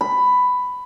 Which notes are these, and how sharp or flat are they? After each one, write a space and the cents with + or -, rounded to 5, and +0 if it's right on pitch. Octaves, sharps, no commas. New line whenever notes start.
B5 +10